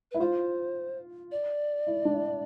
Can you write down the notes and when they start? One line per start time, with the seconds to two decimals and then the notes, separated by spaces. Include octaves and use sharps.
0.11 E4 B4
0.20 F4 C5
1.31 D5
1.87 E4
2.05 D4
2.14 E4